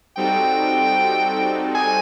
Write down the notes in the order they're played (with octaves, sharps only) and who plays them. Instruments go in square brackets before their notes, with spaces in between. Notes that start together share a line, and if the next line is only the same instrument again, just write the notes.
[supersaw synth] G3 C4 D#4 F#4 A4 [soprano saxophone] G5
[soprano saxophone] G#5